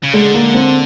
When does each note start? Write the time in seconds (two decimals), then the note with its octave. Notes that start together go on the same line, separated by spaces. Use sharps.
0.03 C#3
0.14 D3 G#3
0.34 A#3
0.54 C4